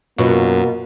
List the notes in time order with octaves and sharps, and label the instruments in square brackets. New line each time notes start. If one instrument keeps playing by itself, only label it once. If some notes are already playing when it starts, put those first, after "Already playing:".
[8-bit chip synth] F#2 [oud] B2 [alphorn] A#3 [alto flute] F4